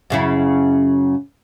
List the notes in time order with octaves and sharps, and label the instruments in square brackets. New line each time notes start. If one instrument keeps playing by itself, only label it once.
[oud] F#2 C#3 E4